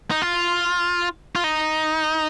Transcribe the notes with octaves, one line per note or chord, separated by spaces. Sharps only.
D#4
F4
F4
D#4